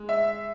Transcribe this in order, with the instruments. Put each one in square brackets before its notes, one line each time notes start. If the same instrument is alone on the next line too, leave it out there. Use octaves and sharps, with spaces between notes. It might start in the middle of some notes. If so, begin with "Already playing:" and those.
Already playing: [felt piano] G#3
[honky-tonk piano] E5